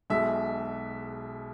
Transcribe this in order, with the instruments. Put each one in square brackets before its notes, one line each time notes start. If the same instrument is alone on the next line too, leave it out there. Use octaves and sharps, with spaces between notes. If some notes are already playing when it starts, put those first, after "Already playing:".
[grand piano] B1 B2 G#3 E5